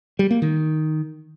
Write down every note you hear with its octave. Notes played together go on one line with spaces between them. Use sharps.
G3
A#3
D#3